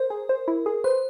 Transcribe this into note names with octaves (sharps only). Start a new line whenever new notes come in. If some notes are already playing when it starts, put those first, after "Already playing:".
Already playing: A#4 C5
G#4
C5
E4
G#4
B4 C5